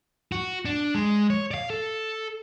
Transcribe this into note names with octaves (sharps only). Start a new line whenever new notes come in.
F#4
D4
G#3
C#5
D5 F5
A4